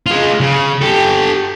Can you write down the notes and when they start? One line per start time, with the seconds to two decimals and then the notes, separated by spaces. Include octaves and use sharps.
0.06 G#3 F4
0.40 C#3
0.81 G4 A4